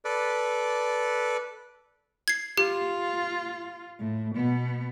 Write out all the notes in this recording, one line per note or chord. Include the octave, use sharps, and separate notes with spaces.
A4 B4 D5
G#6 C7
F4 G4
A2
B2 B3